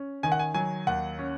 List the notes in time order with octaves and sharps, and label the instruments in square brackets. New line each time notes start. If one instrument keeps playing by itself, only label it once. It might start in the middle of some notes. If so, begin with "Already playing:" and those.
Already playing: [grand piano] C#4
D#3 G#5
F#5
G#5
F#3 G#5
D#2 F#5
C#4